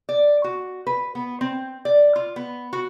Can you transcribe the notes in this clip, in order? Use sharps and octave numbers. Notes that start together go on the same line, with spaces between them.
D5
F#4
B4
B3
C4
D5
F4
B3
F#4